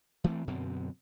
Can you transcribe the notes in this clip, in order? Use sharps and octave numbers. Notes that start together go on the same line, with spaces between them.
E3 A3 B3 C4
F#2 B2 D3 C4